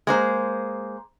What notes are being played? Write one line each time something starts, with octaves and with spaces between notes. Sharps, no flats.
G#3 A#3 C5